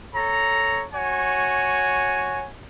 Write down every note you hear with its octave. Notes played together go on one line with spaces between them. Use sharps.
A4 C#5 A#5
F#4 C#5 G#5